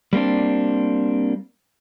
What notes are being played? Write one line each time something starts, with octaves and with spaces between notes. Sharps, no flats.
G3 A#3 C4 D4